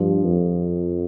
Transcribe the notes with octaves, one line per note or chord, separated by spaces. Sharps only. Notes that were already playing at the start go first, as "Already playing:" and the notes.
Already playing: G2 F3
F2